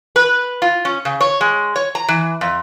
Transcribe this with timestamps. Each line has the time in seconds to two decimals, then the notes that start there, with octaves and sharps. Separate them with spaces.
0.16 B4
0.62 F4
0.85 C#4
1.05 C#3
1.21 C#5
1.41 G#3
1.76 C#5
1.95 A#5
2.09 E3
2.41 F2